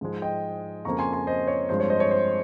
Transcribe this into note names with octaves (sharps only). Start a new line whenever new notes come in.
G#2 F3 G#3
D#5 G5
F2 C#3 F3 A#3 A#5 C#6
G#5 C6
G#5 C6
C5 D#5
C#5
G2 F3 G#3 C4 C5
C#5
C5 D#5
C#5
C5